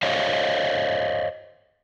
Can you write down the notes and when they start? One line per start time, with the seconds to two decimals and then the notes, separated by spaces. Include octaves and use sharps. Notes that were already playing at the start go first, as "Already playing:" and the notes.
0.03 C5 C#5 D#5 F5